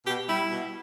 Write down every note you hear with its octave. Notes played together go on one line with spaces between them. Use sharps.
B2 G4
G3 E4
B2